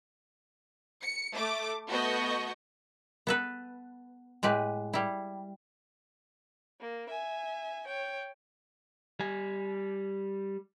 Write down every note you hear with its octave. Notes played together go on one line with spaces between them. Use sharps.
C#7
A3 D6
A3 B3 F#4 D#5 C#6 G6
B3 A4 B4
A2 G#3 G4 B4
G3 E4
A#3
E5 G#5
C#5 G5
G3 G#5